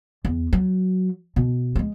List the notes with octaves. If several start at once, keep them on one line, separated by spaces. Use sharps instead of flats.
E2
F#3
B2
G#3 A3